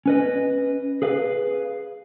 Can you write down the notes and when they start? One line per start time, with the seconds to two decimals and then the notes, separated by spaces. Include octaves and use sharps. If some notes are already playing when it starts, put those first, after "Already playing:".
0.06 C#4 B4 D#5
1.02 G#4 B4 F5